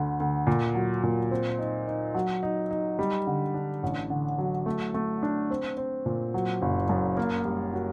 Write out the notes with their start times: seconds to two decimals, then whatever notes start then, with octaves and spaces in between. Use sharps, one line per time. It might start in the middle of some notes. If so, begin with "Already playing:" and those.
Already playing: D2 D3
0.20 D2
0.47 A#2
0.75 F#3
1.03 A#2
1.31 C4
1.59 D#4
1.88 D#4
2.14 F#3
2.43 D#4
2.71 D#4
2.99 G3
3.27 D3
3.54 D4
3.83 A1
4.10 D3
4.38 F#3
4.66 A3
4.94 A3
5.23 D4
5.50 C4
5.77 C4
6.06 A#2
6.34 F#3
6.62 F#1
6.89 F#2
7.17 A#3
7.45 G3
7.73 F#4